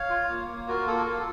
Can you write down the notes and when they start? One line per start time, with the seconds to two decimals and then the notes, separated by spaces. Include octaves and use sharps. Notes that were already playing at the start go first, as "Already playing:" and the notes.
Already playing: C#5 F5
0.10 F4
0.29 A#3
0.48 A#3
0.68 F4 F#4 A#4
0.87 A#3 A4
1.06 F4 A4